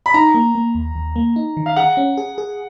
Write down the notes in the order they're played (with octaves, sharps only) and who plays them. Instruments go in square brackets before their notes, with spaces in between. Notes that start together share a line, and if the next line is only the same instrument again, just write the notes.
[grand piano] B5
[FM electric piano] D#4 [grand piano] A#5
[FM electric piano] A#3
A#3
D#2
D#2
A#3
D#4
D#3
[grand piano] F5
[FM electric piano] G#4 [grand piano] F#5
[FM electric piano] C#4
G#4
G#4